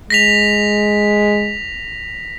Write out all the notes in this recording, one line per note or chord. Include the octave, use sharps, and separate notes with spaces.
G#3 A#6 B6 F7